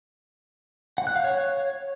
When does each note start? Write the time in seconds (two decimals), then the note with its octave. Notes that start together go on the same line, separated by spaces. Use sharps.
0.98 F#5
1.07 F#6
1.16 F5
1.24 C#5